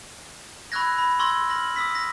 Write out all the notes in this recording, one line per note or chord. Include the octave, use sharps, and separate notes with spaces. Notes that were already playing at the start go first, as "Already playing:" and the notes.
B5 C#6 E6 F#6 G#6 A#6
B5
C6 C#6 E6 G#6 A#6
C6 F6 A#6 F#7
D#6 E6 B6
A#6